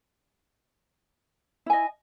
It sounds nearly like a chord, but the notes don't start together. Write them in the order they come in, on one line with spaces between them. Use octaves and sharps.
E4 G#5 D#5